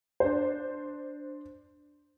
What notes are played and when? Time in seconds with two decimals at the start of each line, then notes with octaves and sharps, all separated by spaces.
0.20 D4 C5